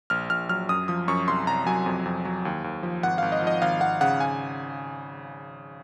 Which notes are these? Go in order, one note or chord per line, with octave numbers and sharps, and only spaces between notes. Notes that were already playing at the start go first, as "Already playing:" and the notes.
A#1 F6
A#1 F6
F#3 F6
F#2 D#6
F3 D#6
F#2 C#6
C2 C6
C2 A#5
F#3 G#5
F2
F2
F#3
D#2
D#2
F3
G#1 F#5
G#1 F5
D#5
F3 D#5
G#1 F5
G#1 F#5
C#3 F#5
G#5